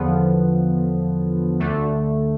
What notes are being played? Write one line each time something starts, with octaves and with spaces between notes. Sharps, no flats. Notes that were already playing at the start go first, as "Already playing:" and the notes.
Already playing: E2 D3 F3 B3
D2 D3 A3